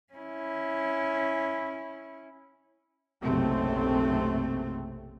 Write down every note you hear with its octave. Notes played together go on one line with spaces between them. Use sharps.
C#4 E4
F#1 B1 C3 A3 C4